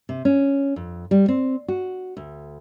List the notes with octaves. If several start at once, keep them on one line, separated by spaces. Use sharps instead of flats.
C3
C#4
F2
G3
C4
F#4
D2